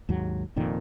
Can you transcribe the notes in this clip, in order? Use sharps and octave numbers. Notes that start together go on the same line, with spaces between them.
D#2 G#2 F#3
F1 F2 A#2 D#3